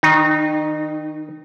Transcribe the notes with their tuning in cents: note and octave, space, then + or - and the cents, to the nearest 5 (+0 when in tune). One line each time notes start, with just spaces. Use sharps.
D#3 +10 D#4 -35